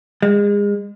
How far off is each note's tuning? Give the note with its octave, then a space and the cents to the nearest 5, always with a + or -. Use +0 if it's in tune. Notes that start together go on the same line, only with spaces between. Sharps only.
G#3 -30